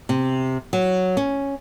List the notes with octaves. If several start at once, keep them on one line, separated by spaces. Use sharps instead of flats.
C3
F#3
C#4